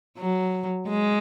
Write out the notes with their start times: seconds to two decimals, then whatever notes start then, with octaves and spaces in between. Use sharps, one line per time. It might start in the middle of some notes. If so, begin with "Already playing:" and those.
0.18 F#3
0.89 G#3